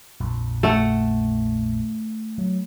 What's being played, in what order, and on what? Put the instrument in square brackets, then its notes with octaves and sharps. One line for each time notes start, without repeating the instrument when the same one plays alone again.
[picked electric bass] A#1 F2 A#2
[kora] A3 F#5
[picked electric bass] F#3